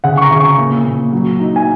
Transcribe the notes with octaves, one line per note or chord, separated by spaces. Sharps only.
C#3 F#5
C#6
A#5
C#3
C#6
A#2
A#2
F#3
D#4
G#5